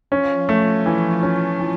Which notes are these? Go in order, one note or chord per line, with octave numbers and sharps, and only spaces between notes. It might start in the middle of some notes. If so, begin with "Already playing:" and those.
F3 C#4 F4
A3
E3 F3 F4
C#4
E3